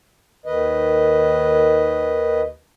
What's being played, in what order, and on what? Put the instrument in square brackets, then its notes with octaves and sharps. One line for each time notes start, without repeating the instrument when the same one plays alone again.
[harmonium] D#2 D#3 B4 D#5